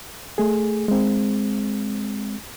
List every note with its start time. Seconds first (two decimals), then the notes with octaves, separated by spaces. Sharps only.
0.38 A3 G#4
0.88 G#3 C4